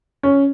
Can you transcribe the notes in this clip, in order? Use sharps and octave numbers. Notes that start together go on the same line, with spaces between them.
C#4